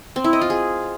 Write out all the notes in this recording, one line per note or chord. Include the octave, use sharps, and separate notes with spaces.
C4
E4
D#5
F4
G#4